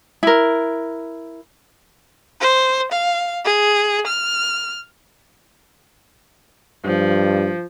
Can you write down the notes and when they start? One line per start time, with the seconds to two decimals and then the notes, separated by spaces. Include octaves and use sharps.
0.23 E4 A#4
2.41 C5
2.92 F5
3.45 G#4
4.07 F6
6.85 G2 F3